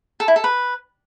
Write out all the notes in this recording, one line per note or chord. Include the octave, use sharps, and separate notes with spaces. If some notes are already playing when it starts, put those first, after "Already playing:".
A4
E4
A4
B4